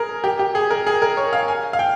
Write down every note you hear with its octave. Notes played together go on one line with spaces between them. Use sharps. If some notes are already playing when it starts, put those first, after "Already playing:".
Already playing: G#4 A#4
G4
G4
G#4
A#4
G#4
A#4
C#5
F5
G#5
F5
G5